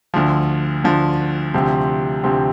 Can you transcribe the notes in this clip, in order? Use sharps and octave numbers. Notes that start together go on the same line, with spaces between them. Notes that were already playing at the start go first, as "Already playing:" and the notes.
D2 D3 F3
D2 D3 F3
D2 C3 F3 C4 G4
D2 C3 F3 C4 G4